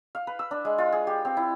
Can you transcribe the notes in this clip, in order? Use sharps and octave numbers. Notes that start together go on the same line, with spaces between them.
F5
B4
E6
D4
G#3
F4
G#4
G4
C4
E4